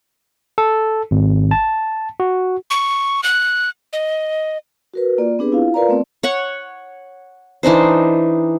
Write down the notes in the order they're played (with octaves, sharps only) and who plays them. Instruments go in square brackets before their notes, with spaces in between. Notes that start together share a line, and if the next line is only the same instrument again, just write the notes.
[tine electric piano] A4
G#1
A5
F#4
[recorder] C#6
F#6
D#5
[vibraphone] F#4 A#4 B4
A#3 F4 D5
B3 C4 D4 G4 G#4 B4
E4 F4 F5
F4 A#4 B4 D5 F5 A#5
A3 B3 C4 D5
[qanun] C#5 F#5 C#6
E3 D4 D#4 C5